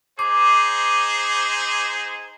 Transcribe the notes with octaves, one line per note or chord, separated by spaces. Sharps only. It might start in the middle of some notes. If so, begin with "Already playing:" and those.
D#4 G#4 C5 D6